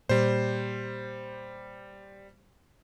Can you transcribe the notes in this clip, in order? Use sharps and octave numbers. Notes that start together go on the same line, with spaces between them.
A#2 G3 C5